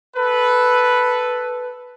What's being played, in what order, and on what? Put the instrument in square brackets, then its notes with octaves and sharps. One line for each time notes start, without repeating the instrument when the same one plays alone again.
[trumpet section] A4 B4